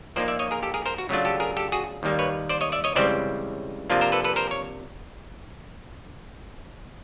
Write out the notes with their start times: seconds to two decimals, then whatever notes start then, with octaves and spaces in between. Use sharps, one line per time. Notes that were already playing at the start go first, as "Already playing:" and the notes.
0.16 A#2 F3 A#3 D#4 C5 D5
0.28 D5 E5
0.39 C#5 D#5
0.51 G#4 A#4
0.63 G4 A4
0.74 G#4 A#4
0.86 A#4 C5
0.98 F#4
1.09 C#3 F#3 A3 D4 F4
1.25 G4 A4
1.40 G#4 A#4
1.57 G4 A4
1.72 F#4 G#4
2.03 D#2 D#3 G3 A#3
2.19 B4 C#5
2.49 C5 D5
2.61 C#5 D#5
2.72 D5 E5
2.84 C#5 D#5
2.96 C#2 C#3 E3 G3 C4 C5 D5
3.90 C3 F3 A#3 D4 F4
4.01 A#4 C5
4.12 A4 B4
4.24 A4 B4
4.36 A#4 C5
4.51 C#5